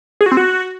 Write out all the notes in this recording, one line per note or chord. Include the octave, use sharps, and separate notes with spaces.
G#4
F#4
C4
F#4